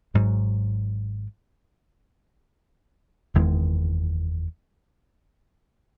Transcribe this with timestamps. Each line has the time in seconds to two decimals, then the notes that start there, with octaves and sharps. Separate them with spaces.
0.14 G#1 G#2 F#3
3.34 F#1 E2 D#3 G#3